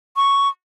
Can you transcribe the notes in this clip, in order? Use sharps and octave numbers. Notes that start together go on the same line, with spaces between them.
C#6